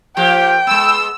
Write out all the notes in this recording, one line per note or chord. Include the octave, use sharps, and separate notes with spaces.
F3 A#3 G4 G5
G#3 B3 E6